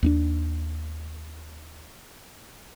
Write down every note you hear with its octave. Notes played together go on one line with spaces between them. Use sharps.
D#2 B3 D4